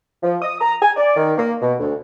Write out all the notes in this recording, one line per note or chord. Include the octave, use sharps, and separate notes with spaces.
F3
D#6
A#5
G#5
D5
D#3
A#3
B2
D2